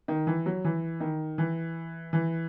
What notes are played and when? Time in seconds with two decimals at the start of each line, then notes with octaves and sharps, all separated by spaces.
0.08 D#3
0.27 E3
0.46 F#3
0.64 E3
1.00 D#3
1.38 E3
2.13 E3